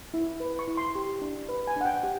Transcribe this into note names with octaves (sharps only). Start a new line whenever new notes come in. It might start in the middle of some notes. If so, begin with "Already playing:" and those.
E4
B4
C#6
E4
C6
G4
D4
B4
G#5
D4 F#5
G5
G4 F#5